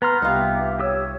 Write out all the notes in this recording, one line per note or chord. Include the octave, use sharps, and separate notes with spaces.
B3 B4 A#5 C6 F6
C2 D#4 F4 G4 E5
G4 C#5 D#6 E6